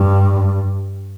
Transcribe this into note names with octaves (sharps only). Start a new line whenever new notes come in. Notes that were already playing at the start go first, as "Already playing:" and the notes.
Already playing: G2